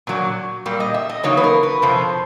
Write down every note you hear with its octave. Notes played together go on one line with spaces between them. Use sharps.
A#2 F#3 A#3
A#2 G3 A#3
D#5
E5
D#5
E2 C#3 F#3 A#3 D#4 C#5
B4
A#4
B4
F2 C3 F3 C5